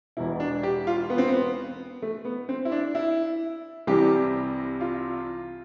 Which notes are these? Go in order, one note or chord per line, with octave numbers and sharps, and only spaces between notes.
E1 E2 B2 E4
D4
G4
F4
B3
C4
B3
A3
B3
C4
E4
D4
E4
C2 C3 E3 G3 G4
F4